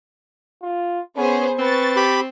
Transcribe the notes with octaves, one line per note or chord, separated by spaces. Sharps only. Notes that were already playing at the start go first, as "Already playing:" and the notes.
F4
B3 C#4 G#4 C5
C4 B4 C#6 A6
G4 B5